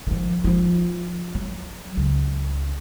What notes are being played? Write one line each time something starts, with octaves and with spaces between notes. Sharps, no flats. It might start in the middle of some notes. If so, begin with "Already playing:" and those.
D#3 F3
F3 F4
F#3
C#2